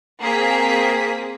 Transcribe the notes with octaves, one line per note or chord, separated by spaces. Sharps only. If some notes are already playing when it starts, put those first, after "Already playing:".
A#3 C4 G#4 B6